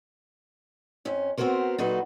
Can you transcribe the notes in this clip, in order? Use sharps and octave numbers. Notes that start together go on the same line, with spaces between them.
F2 C#4
B3 C4 F#4 G#4 A#4 C5
A#2 F#3 D#4 F#4 A4 B4